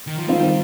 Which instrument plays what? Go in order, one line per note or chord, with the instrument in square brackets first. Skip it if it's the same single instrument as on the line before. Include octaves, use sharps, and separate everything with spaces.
[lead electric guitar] D#3
F3
[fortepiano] D#3 C4 F4 [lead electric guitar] G3